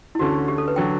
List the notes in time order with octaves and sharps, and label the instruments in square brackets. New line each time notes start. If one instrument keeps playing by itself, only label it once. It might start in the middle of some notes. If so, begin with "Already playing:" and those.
[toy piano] E4
[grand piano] D2 D3 A3 C#4 [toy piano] F#4
[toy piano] G4
A4
B4
[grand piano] D3 F#3 [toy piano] G5